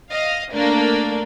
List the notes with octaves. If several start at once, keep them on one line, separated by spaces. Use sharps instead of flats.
D#5 F5
A3 A#3 D4